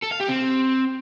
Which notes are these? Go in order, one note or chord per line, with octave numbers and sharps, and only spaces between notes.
A4
F5
G4
C4